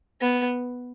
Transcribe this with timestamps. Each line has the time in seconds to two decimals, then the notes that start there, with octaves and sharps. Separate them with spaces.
0.21 B3